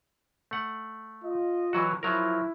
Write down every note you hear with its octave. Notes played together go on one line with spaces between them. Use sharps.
A3 F#5
F4 D#5
E3 F#3 F#4
F3 F#3 E4 A#4